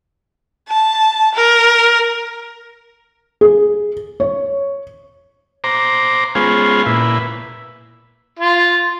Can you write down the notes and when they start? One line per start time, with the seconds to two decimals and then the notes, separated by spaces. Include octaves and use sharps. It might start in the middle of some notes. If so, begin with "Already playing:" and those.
0.69 A5
1.34 A#4
3.41 G#4
4.20 C#5
5.64 C5 A#5 D6
6.35 G#3 B3 C#4 F4 G#4 C5
6.86 A#2 E4 B4
8.39 F4